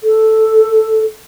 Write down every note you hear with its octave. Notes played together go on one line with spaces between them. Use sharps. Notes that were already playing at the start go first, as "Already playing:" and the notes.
A4